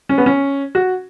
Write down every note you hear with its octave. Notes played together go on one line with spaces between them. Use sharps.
C#4
B3
C#4
F#4